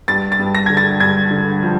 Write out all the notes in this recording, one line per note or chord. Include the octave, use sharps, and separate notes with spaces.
G2 A6
A6
G2
A#6
D3 G#6
A6
G2 G#6
D3
F3